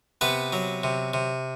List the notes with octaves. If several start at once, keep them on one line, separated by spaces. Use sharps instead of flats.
C3 B3 B4
F#3
C3
C3